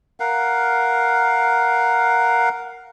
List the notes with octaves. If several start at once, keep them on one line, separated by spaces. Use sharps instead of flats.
A#4 F5 F#5